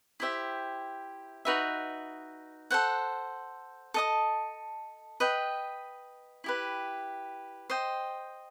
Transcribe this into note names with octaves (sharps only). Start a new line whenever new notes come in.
E4 G4 C5 E5
D#4 F#4 B4 E5
A4 C5 F#5
A4 D#5 A5 D#6
B4 D#5 G5
E4 G4 B4
C5 D#5 G5